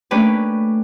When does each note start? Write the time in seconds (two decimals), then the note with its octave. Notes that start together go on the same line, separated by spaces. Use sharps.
0.11 A3 A#3 C#4 D4 G4 B4